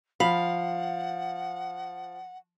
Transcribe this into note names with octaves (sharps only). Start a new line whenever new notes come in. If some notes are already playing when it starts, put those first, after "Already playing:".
F3 F5 F#5 B5 B6 F7